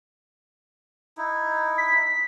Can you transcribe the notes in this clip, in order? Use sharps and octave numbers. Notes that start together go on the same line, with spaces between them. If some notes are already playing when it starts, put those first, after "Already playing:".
D#4 E4
B6